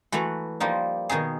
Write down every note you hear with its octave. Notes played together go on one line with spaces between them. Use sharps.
E3 A3 F#4 B4 A#5
F3 G3 A#3 D#4
B2 D#3 D#4 G#4